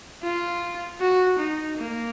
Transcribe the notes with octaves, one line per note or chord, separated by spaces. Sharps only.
F4
F#4
D#4
A#3